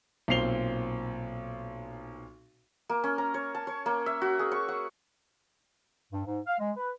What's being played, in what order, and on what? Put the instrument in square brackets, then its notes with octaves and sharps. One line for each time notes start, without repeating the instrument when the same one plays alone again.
[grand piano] B1 A#2 C4 C7 F7 G7
[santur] A#3
C#4
A#5
C#5
A5
C#5
A#3
E5
F#4
G#4
C#6
F#5
[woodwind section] G2
G#2
F5
G#3
B4